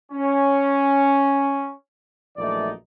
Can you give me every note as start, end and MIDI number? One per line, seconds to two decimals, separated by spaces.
0.12 1.73 61
2.37 2.70 34
2.37 2.70 42
2.37 2.70 52
2.37 2.70 57
2.37 2.70 63
2.37 2.70 74